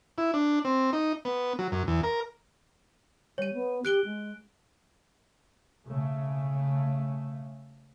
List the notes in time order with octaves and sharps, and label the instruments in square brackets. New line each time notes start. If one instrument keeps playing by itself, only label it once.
[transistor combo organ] E4
D4
C4
D#4
B3
F#3
F#2
E2
A#4
[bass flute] G3 [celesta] C#5 D#7
[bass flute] B3
[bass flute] G4 [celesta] F#6 D7 G7
[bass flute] G#3
[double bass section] C#3 A3